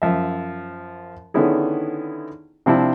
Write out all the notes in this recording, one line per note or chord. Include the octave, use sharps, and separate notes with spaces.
F#2 F3 E5
D3 D#3 B3 C#4 E4 G#4
C3 F3 C4 D4 E4